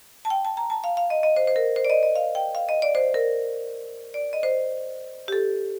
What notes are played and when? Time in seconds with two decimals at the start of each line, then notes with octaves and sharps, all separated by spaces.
0.25 A5
0.30 G5
0.45 A5
0.57 A#5
0.70 A5
0.84 F5
0.97 F5
1.10 D#5
1.23 D#5
1.36 C5
1.47 C5
1.56 A#4
1.76 C5
1.85 D5
1.90 D#5
2.03 D#5
2.15 F5
2.35 G5
2.55 F5
2.69 D#5
2.82 D5
2.95 C5
3.14 A#4
4.14 D5
4.33 D#5
4.43 C5
5.28 G4
5.32 A4